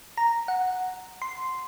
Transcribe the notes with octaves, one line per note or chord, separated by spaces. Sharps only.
A#5
F#5
C6